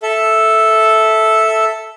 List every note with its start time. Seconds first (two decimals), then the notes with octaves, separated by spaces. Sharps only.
0.03 A4 E5